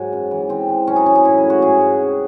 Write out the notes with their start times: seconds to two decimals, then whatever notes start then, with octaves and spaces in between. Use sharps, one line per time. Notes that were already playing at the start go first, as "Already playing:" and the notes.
Already playing: G#2 F#3
0.13 F#2
0.31 E3
0.49 E3 C4
0.69 E3
0.87 F#2 C#4
0.96 D#4
1.06 E3 C#4
1.15 D#4
1.25 A2 E4
1.37 G#4
1.44 F#3
1.50 F#4
1.62 G#2 G#4
1.81 G#2
2.00 C3